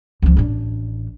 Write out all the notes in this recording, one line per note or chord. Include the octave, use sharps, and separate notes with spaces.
C#2 F3
A1 D4